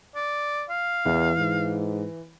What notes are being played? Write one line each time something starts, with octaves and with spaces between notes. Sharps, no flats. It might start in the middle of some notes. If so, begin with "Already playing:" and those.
D5
F5
E2 E3
G#2